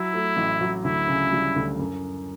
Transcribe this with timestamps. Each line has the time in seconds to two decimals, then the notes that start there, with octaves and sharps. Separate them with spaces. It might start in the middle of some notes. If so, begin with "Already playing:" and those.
Already playing: F#3 E4
0.14 A3
0.37 A1
0.61 F#3
0.84 D2 E4
1.08 C#3
1.32 G3
1.56 D2
1.79 F#2